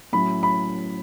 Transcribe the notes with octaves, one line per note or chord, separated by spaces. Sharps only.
A2 F#3 C#4 E4 B5
B5